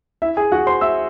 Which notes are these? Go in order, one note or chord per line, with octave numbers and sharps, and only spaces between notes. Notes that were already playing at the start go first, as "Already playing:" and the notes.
E4 E5
G#4 G#5
F#4 F#5
C5 C6
E5 E6